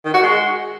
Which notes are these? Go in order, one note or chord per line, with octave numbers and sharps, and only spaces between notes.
D#3
F#4
G#3